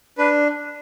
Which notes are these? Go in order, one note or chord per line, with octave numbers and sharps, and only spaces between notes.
D4 B4